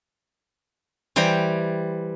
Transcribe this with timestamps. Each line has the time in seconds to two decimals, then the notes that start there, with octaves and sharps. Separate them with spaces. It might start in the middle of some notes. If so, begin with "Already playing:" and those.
1.16 E3 G3 C5 G5 A#5